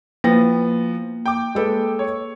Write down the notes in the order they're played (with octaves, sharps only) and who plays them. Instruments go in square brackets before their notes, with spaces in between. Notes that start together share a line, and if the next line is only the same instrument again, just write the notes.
[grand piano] F3 B3 [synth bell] A#3 [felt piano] A#6
[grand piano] G5 D6
[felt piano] G#3 A4 B4
[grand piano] C#5